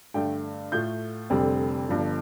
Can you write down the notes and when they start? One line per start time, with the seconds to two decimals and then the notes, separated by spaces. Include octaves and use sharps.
0.14 G2 D3 A3 G5
0.72 A2 A3 F4 G6
1.30 F1 F2 D3 G3 C4
1.88 G1 G2 F3